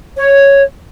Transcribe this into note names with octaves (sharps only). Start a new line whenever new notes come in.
C#5